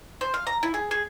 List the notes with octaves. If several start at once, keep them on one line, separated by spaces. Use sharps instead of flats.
C5
F5
A#5
E4
G#4
G#4